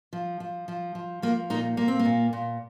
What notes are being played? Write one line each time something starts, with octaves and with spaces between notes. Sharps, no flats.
F3
F3
F3
F3
F3 A#3
A#2 A#3 D#4
A#2 A#3
C4
A#3
A#2
A#2